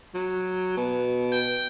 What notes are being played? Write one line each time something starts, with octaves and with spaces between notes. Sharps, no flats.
F#3
B2
G5